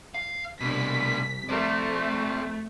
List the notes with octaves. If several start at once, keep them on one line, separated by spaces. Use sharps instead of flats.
F5
C2 B2 D4 B6
F2 A3 C4 D5